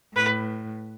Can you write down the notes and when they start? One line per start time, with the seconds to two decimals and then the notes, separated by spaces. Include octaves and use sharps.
0.15 A2 B4